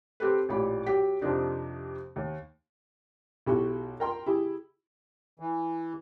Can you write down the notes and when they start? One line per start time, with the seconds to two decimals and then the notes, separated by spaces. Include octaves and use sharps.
0.20 C4 G4 A4 B4
0.49 A1 A#2 G4 B5
0.86 F#3 G4 G5 B6
1.21 F2 C3 F3 C4 D4 D#4
2.16 D#2
3.46 B1 E4 F#4 G4 C#6
4.00 A#4 G5 C6
4.26 E4 G4 G#4
5.40 E3